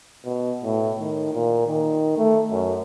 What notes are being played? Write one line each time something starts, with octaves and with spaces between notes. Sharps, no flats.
B2
A2
D#3
A#2
D#3
A3
F#2